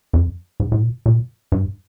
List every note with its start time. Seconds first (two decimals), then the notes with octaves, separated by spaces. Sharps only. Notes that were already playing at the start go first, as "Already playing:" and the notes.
0.13 F2
0.60 G#2
0.72 A2
0.82 A#2
1.06 A#2
1.52 G2